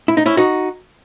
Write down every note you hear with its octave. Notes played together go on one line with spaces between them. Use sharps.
E4
D#4
C#4 E4
D#4 F#4